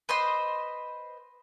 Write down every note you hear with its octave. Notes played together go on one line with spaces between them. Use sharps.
B4 C5 D#5 C6